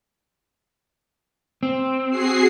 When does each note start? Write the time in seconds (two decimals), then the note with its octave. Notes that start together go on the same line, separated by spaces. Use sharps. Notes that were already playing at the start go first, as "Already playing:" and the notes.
1.63 C4
2.10 F#4 G#4 C7